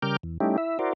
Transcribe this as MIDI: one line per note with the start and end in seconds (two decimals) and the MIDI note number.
0.02 0.16 49
0.02 0.16 55
0.02 0.16 70
0.02 0.16 86
0.02 0.16 89
0.02 0.16 91
0.23 0.38 40
0.40 0.57 55
0.40 0.57 57
0.40 0.57 61
0.40 0.57 63
0.40 0.57 64
0.40 0.57 67
0.58 0.79 64
0.58 0.79 76
0.79 0.93 64
0.79 0.93 66
0.79 0.93 70
0.79 0.93 72
0.79 0.93 74